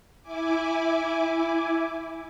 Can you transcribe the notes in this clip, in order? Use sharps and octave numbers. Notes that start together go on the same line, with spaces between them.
E4 G#5 D6